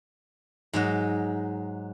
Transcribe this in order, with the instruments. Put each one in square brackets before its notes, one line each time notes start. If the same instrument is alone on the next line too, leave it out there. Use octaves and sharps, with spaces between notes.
[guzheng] G#2 F#3 D#5